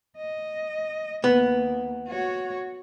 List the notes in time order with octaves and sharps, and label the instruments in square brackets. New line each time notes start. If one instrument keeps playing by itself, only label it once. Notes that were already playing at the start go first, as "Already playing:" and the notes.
[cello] D#5
[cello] D#2 A#3 [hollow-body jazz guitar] B3
[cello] F#4 C#5